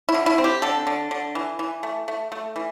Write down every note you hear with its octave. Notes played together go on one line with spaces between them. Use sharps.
E4
D3
E4
C4
G4
D3 A4
D3
D3
E3
E3
A3
A3
A3
E3